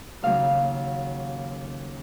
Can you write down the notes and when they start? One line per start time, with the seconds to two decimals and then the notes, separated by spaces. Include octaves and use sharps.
0.22 D#2 C#3 F#3 A#3 F5